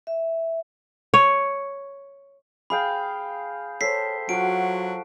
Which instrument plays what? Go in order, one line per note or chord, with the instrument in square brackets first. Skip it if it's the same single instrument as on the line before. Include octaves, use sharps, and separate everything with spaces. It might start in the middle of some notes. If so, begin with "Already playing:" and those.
[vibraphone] E5
[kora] C#5
[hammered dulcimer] G#4 F5 G5 [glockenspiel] B5
[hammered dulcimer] A4 C5 [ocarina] C#5 [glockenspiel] B6 C7
[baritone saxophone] F#3 [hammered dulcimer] F4 F#4 [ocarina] F#5 [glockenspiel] D7